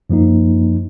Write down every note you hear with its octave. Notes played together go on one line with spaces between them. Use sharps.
F#2 F3 A#3 D#4